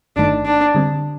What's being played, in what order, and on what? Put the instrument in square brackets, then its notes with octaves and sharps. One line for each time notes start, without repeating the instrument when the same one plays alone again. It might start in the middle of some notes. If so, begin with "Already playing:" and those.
[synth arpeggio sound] G1 G2 D#3 A3 D#4 [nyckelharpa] D4
[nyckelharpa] D4
[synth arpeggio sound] D3 G3 C4